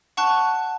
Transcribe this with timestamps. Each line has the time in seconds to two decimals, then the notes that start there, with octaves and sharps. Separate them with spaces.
0.17 F#5 A5 C#6 F#6